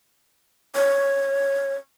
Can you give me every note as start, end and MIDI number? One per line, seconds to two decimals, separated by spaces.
0.75 1.76 73